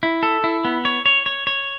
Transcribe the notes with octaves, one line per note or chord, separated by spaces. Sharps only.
E4
A4
E4
B3
C#5
C#5
C#5
C#5